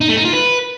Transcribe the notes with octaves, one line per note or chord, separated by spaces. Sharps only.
D#4
A3
D#4
F4
B4